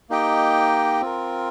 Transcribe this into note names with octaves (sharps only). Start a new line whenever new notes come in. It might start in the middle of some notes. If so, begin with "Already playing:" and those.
A#3 D#4 G4 D#5 G5
C4 F4 A#4